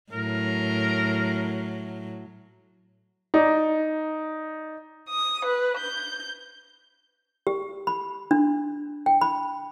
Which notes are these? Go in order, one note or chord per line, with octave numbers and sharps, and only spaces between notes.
A2 F#3 A#4
D#4 D5
D#6
B4
G6
G4
B5
D4
G5
B5